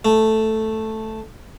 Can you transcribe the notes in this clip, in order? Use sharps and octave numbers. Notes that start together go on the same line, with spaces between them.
A3